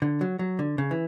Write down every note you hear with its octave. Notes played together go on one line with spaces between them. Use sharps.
D3
F#3
F#3
D3
C#3
E3